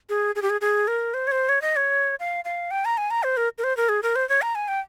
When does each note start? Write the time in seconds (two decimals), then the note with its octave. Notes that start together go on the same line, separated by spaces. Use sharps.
0.09 G#4
0.35 G#4
0.42 G4
0.50 G#4
0.61 G#4
0.88 A#4
1.14 C5
1.27 C#5
1.32 C5
1.49 C#5
1.62 D#5
1.76 C#5
2.20 F5
2.45 F5
2.71 G5
2.85 A#5
2.98 G#5
3.11 A#5
3.23 C5
3.37 A#4
3.58 A#4
3.64 C5
3.77 A#4
3.89 G#4
4.03 A#4
4.16 C5
4.29 C#5
4.42 A#5
4.55 G#5
4.68 G5